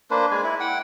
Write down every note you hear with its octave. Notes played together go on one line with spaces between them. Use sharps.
A#3 D4 B4 C5
G#3 G#5
E4
F#5 G5